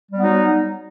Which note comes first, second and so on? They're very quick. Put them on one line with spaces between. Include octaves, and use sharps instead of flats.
G3 B3 D#4 F#3